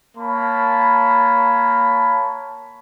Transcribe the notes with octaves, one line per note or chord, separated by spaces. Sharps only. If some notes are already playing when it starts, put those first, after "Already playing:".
A#3 C#5 A5 B5